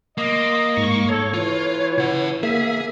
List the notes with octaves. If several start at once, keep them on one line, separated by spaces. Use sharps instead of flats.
A#3 D#5 C6 D6
G#2 C#6
A4 C#5
E3 F4
C#3 F#5
A#3 G#4 E5